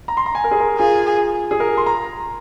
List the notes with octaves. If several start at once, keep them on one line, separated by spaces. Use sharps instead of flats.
A#5
C6
A#5
G#5
A#4
G#4
A#4
F4 G#4
G#4
A#4
C6
A#5